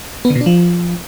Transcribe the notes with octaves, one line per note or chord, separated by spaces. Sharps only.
B3
D3
B2
D4
F3